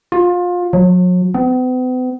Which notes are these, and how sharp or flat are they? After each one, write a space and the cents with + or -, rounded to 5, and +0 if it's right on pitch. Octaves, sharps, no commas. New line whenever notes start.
F4 +25
F#3 -40
B3 +45